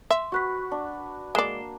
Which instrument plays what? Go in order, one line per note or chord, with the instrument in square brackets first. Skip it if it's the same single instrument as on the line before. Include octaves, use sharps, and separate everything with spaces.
[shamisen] E5 [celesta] C6
[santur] F#4 B4 [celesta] C#6 F#6 B6
[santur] D4
[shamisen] G#3 D5 [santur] A#3 [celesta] C7 E7 G7